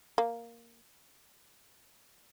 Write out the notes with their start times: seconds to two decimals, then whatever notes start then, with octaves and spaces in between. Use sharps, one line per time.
0.18 A#3